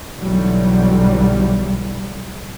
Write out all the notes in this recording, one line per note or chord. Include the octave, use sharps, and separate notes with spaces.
B1 G#2 D3 E3 F#3 G3